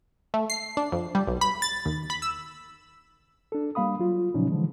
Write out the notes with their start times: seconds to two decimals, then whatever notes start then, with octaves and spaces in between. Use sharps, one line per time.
0.34 A3
0.50 C7
0.77 D4
0.92 F2
1.15 G3
1.27 B1
1.41 B5
1.62 A6
1.85 D#2
2.10 B5
2.22 E6
3.52 D4 A4
3.75 G3 A#3 F5 B5 D#6
3.99 F#3 F4
4.34 A#2 C#3 F3 F#3 C#4 D#4
4.50 D3 E3 F3 G#3